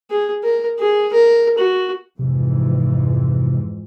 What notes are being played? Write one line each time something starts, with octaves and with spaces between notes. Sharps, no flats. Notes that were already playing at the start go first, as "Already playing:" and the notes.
G#4
A#4
G#4
A#4
F#4
F2 G#2 C3 E3